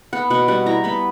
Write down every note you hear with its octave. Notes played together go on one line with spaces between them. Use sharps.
B3 F#5
B2 F#5
G3 F#5
E4 A#5
B3 B5